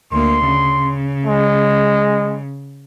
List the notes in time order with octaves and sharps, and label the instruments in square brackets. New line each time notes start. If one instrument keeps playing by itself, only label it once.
[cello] D2 A#3 [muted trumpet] C6
[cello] C#3
[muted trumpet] G#3